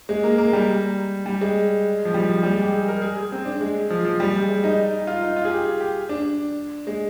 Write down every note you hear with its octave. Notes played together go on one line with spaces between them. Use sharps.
G#3
A#3
A#3
G3
G3
G#3
F3
G3
F3
G3
G#3
G4
G#4
A#4
G#4
G#4
C4
D4
G#3
F3
F3
G3
G#3
G#3
D#4
F4
D#4
F4
G#4
G4
G4
D4
G#3